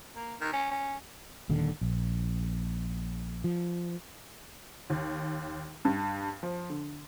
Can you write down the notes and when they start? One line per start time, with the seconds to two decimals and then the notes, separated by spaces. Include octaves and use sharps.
0.15 A#3
0.40 D#3
0.53 C#4
0.71 C#4
1.49 D#1 D#2 D3
1.81 A#1
3.44 F3
4.90 D#2
5.85 G2
6.43 F3
6.70 D3